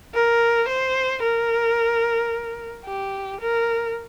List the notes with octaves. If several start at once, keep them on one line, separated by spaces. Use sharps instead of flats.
A#4
C5
A#4
G4
A#4